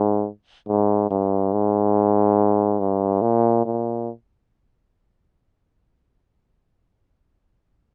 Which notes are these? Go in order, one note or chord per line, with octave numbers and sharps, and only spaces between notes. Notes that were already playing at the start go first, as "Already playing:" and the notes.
Already playing: G#2
G#2
G2
G#2
G2
A#2
A#2